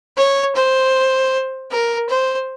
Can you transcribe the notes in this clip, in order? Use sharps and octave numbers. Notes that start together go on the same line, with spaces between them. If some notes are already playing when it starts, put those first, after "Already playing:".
C#5
C5
A#4
C5